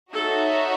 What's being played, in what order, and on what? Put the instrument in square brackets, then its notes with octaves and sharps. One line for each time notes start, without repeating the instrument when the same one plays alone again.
[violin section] D#4 F#4 C#5 E5 [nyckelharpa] A4